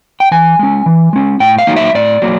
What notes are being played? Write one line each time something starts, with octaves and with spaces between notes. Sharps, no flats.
G5
E3 G#5
G#3 C#4
E3
G#3 C#4
A2 G5
F5
F#3 A#3 D#4
E5
A2 D5
F#3 A#3